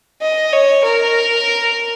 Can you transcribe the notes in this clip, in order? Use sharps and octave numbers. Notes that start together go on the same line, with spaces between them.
D#5
C#5
A#4